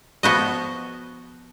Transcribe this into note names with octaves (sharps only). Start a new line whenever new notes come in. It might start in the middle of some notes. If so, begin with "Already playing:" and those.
F3 B3 F#4 D#5